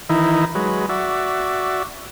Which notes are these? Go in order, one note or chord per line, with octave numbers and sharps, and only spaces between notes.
D#3 E3 D#4 E4
F#3 G#3 B4
F#4 D5 E5